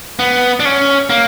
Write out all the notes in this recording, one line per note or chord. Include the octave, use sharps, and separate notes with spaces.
B3
D4
C#4
A#3